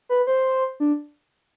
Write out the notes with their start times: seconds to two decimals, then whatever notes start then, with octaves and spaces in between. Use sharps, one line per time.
0.09 B4
0.27 C5
0.80 D4